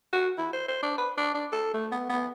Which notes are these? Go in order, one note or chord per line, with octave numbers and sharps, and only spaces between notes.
F#4
E4
C5
C5
D4
B4
D4
D4
A4
A3
B3
B3